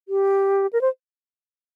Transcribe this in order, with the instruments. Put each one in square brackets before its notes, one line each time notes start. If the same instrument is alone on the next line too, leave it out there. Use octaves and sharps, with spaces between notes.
[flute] G4
A#4
C5